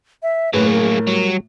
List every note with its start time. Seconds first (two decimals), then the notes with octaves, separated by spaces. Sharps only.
0.23 E5
0.54 A2 F#3 A#3 G#4 B4
0.72 A#4
1.07 F#3 G3